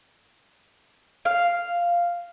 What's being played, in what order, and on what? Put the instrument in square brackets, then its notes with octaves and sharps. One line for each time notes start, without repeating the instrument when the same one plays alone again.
[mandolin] F5